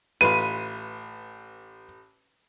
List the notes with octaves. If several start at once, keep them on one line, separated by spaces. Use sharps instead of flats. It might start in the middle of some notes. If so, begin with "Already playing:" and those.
A1 F4 B4 D#7